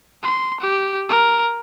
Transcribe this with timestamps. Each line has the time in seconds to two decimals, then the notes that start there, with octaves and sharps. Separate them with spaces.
0.23 C6
0.61 G4
1.09 A#4